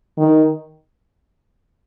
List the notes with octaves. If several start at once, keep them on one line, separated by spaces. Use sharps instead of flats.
D#3